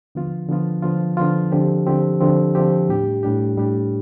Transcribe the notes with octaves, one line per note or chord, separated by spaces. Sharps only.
D3 F3 B3 F4
D3 F3 B3 F4
D3 F3 B3 F4
D3 F3 B3 F4
D3 F3 C4 G4
D3 F3 C4 G4
D3 F3 C4 G4
D3 F3 C4 G4
A2 G3 D4 G4
A2 G3 D4 G4
A2 G3 D4 G4